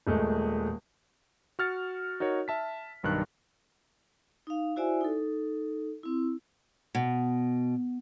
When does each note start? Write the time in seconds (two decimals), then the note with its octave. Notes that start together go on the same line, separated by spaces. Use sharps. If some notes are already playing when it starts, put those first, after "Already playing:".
0.07 D#1 G#3 A3
1.59 F#4 F6 A6 C#7
2.20 D#4 F#4 A#4 C#5
2.48 E5 A5 B6
3.03 B1 G2 D#3 F#6
4.47 D#4 F5
4.76 E4 F#4 C5 D5 E5 G#5
5.01 D#4 A4
6.03 C4 E4
6.95 B2